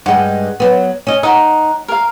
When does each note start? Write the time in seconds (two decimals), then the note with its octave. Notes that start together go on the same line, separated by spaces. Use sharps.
0.06 G2 G#3 F#5
0.60 F#3 B3
1.07 C#4 D#5
1.23 D#4 D#5 F#5
1.88 A#4 F5